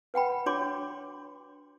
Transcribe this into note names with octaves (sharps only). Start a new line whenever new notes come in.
B4 F#5 G5 B5
D4 F#4 C#5 C6 D6